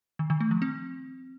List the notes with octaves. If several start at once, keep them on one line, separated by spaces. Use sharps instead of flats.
D#3
D#3
A3
F3
C4